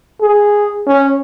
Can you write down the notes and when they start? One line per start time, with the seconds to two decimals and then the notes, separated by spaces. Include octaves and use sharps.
0.21 G#4
0.87 C#4